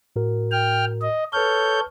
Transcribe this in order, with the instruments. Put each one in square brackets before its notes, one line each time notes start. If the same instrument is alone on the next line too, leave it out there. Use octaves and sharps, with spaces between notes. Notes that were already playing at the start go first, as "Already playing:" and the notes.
[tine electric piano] A2 F#4 A#4
[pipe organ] G5 F6
D#5
[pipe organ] A4 C#5 G6 [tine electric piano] B4 F6